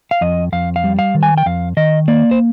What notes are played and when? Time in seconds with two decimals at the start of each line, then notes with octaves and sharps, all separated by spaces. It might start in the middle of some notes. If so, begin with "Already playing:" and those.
0.11 F5
0.21 F2 D#5
0.52 F2 F5
0.76 F5
0.84 G3
0.99 F5
1.14 D#3
1.23 G#5
1.38 G5
1.46 F2 F5
1.77 D#3 D#5
2.08 A#3 D5
2.31 C5